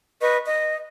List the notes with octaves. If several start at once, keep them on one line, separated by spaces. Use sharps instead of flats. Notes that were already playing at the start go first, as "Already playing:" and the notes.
B4 D#5 C#6
D#5